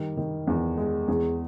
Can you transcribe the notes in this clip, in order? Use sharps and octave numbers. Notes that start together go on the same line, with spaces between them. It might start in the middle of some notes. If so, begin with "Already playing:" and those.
Already playing: D#3 G3
D#3
E2
G#3
E2 G#4